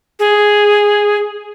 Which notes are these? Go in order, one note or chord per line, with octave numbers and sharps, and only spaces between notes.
G#4